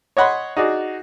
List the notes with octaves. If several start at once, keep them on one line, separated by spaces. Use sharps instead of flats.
C#5 D#5 F#5 B5 C6
D#4 F#4 G#4 D5